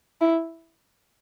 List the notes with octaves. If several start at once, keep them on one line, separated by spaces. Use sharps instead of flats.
E4